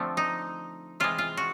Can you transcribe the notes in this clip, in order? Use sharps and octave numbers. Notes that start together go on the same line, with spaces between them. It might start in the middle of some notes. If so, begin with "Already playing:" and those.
Already playing: D3 F3 A3 C4
D#4
C3 E3 G#3 F4
F4
F#4